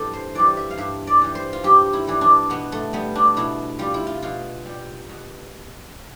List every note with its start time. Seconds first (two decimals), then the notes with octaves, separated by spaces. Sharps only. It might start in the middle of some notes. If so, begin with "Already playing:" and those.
Already playing: G2 E3 A4
0.13 C5
0.35 E3 G3 D5
0.57 E5
0.71 F5
0.77 G2 E5
1.07 D5
1.22 E3 G3
1.35 C5
1.53 F4
1.64 G2 G4
1.93 E4
2.07 E3 G3
2.21 D4
2.50 B2 B3
2.72 A3
2.93 G3 B3
3.15 D4
3.37 B2 E4
3.79 G3 F4
3.94 E4
4.07 F4
4.22 B2 F4
4.65 G3
5.09 B2